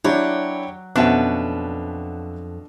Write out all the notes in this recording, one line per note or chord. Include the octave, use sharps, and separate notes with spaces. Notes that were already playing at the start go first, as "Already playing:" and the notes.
F#3 D4 E4 G4 C#5
F2 B2 C#4 D4 B4 E5 F#5